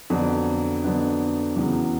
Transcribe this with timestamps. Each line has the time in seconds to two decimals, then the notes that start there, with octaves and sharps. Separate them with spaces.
0.10 F2 D3 F#3 B3 D4
0.84 F2 D3 F#3 B3 D4
1.56 E2 C#3 F#3 B3